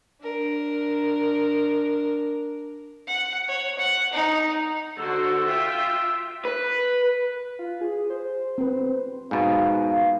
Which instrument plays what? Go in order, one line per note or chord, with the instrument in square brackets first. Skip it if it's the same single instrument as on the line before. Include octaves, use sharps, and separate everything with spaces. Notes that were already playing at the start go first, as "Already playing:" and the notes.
[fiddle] D4 A#4
F#5
C#5
F#5
D#4
[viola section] D3 F#4 C5 [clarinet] E6
[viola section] F4 E5 G5
[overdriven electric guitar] B4
[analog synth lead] F4
G#4
C5
[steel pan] C4 B4
[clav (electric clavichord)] G#2 B2 [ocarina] F5